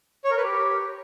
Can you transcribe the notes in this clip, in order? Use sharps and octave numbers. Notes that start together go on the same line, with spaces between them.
C#5
A#4
B4
G4